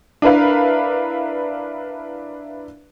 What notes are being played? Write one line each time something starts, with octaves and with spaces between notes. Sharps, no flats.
D4 E4 A#4 B4 F5